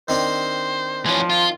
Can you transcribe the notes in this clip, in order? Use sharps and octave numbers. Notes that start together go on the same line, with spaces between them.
D#3 C4 D4 C5
E3 F3 C#4
F4